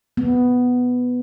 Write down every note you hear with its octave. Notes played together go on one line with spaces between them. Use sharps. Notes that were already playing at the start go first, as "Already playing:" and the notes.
B3